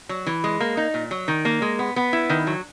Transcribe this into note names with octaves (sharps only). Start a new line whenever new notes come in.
F#3
E3
G#3
A#3
D#4
A#2
F#3
D#3
A#3
G#3
B3
B3
E4
D#3
F#3